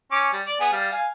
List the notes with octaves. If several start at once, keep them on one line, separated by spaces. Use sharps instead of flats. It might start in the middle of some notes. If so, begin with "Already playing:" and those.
C#4 D6
G3
D5
B3 G#4
G3 F5
F5 G#5